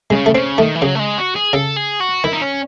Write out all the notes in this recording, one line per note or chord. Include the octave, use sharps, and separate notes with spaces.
C#3 G#3
A3
C#3 C4
D#3 A3
E3
C#3 F#3
A3
G#3
F#4
G#4
C#3 A4
G#4
F#4
D#3 E4
D#4
C#4